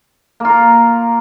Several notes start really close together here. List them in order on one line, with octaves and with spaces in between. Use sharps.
A#3 F4 A#4